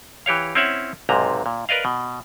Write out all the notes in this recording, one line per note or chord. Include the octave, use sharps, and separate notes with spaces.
E3 G4 C#5 F5
C4 C#4 E4 C#5 E5 F#5
B1 G#2 C3 A#5
A#2
A#4 B4 D5 D#5 F5
B2